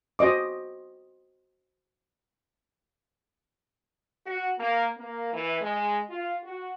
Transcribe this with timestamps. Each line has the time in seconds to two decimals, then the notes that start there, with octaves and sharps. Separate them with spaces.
0.19 F#4 C5 D#5 D6
4.25 F#4
4.58 A#3
4.97 A#3
5.33 E3
5.61 G#3
6.09 F4
6.42 F#4